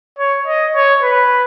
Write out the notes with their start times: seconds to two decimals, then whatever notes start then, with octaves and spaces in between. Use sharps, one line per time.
0.19 C#5
0.47 D#5
0.75 C#5
1.03 B4